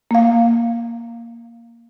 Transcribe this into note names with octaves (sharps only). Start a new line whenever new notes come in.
A#3 F5